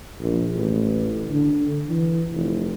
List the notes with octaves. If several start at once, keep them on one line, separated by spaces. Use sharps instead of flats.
A#1
A1
D3
E3
F1